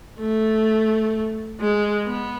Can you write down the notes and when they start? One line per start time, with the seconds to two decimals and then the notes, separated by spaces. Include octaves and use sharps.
0.20 A3
1.60 G#3
2.06 B3